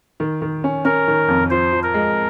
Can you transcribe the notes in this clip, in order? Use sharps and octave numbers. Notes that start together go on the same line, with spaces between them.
D#3
D#3
C#4
C#4 A#4
D#3
F2
F3 C5
F3
A#4
G#3